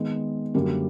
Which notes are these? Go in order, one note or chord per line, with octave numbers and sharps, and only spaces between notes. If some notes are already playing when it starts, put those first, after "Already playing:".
Already playing: D#3 G#3 B3
F#2 D3 G3 A#3